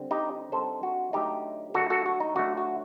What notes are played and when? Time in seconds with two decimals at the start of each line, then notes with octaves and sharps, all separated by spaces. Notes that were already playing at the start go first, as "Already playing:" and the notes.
Already playing: D3 G3 C4
0.11 D#4 G4
0.52 D3 G3 C4 D#4 A4 C5
0.83 F#4
1.13 D3 F#3 A3 D#4 G4
1.74 D3 F#3 A3 F#4 A4
1.90 F#4 A4
2.06 F#4
2.20 D#4
2.36 D3 F#3 A3 F#4
2.57 F#4